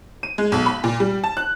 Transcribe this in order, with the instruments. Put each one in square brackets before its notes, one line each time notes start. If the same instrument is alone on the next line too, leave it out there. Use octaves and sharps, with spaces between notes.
[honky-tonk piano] D#7
G#3
B1
B5
A#2
G3
A5
F#6